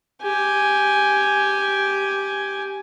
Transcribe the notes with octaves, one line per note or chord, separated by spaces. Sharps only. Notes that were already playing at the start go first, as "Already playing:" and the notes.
G4 G#5